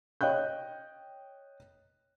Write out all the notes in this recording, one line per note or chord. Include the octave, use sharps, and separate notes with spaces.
C#5 D#5 G5 F#6 G6